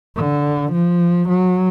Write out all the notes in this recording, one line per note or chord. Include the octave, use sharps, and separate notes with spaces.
D3
F3
F#3